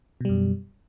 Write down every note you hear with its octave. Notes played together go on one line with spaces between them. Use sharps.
F#2 B2 G3